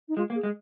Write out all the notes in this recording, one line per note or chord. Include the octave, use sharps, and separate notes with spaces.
D#4
G#3 F4
A#3
G#4
G#3